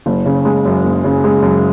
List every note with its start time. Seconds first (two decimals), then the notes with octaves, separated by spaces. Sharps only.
0.06 F#1
0.25 C#3
0.45 G#3
0.65 F#2
0.84 F#1
1.04 C#3
1.24 G#3
1.42 F#2